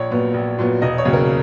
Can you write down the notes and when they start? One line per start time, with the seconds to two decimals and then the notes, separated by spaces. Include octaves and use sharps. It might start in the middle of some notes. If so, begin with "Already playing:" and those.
Already playing: A#1 C#5
0.11 A#2 F#3 B3
0.34 A#1
0.59 A#2 F#3 B3
0.82 E1 D#5
0.98 C#5
1.05 D#2 C#3 F#3
1.13 A#4